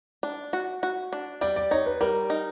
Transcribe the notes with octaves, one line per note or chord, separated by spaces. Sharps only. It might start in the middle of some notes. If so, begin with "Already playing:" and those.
D4
F#4
F#4
D4
G3 D5
D5
D#4 C#5
B4
G3 A#4
D#4